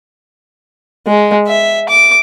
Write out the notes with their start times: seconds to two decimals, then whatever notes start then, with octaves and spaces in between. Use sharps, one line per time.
1.07 G#3
1.47 E5
1.89 D6